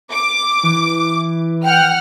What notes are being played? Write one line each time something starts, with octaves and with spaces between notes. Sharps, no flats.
D6
E3
F#5 G5 F6